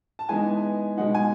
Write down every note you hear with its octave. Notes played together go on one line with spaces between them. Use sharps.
A5
E3 G#3 B3 D#4 G#5
B2 G#3 D#4 F#5
G#5